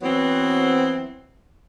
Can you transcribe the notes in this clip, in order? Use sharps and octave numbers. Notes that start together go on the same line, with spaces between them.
E3 F#3 B3 C4